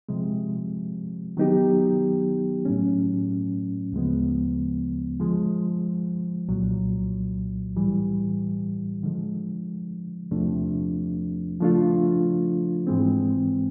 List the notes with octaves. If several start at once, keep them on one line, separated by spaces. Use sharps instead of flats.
C3 F3 G#3
D#3 F#3 B3 D#4 G4
A2 F#3 A3 C#4
D2 C#3 F3 G#3 B3
D3 F3 G#3
C2 A#2 F#3
A2 E3 G3
D3 F3 G#3
E2 C3 F3 A3 D4
C#3 F3 A3 D4 F4
G#2 E3 G#3 C4